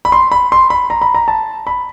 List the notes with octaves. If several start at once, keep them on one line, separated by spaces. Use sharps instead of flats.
B5
C6
B5
C6
B5
A#5
B5
A#5
A5
B5